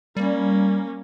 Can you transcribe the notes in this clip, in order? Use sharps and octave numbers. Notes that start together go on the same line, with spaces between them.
G3 A#3 C#4